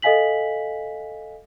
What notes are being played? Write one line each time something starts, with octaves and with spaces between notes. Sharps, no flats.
A4 D#5 F5 G#5 B6 F#7